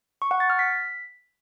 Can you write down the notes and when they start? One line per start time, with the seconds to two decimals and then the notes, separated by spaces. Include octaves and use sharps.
0.22 C#6
0.31 F#5
0.40 A6
0.50 F6
0.59 B6